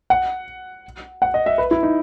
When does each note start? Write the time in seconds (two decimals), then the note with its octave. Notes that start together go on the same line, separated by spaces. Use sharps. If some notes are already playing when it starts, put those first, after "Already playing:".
0.10 F#5
1.22 F#5
1.34 D#5
1.46 E5
1.58 B4
1.71 E4
1.83 D#4